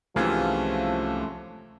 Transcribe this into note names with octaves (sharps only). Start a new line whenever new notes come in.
C2 G#2 C3 E3 F3 A3 C#4 F4